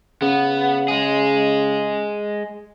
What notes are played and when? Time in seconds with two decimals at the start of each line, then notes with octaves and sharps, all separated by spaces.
0.22 C#3 B3
0.88 G#3 G#4